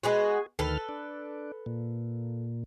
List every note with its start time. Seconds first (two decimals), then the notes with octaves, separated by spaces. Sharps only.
0.03 G#3 B3 F#4 G#4
0.59 D2 D#3 A4 B4 F6
0.89 D4
1.66 A#2